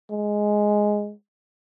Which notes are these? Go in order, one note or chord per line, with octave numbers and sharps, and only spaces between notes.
G#3